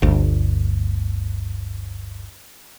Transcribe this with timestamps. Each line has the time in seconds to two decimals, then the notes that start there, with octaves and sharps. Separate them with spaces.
0.02 G1 D2